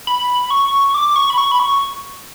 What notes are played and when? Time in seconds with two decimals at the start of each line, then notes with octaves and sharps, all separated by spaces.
0.07 B5
0.51 C#6
0.94 D6
1.16 C#6
1.30 B5
1.38 C#6
1.52 B5
1.59 C#6